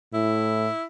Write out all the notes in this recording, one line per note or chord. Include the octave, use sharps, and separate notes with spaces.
A2 E4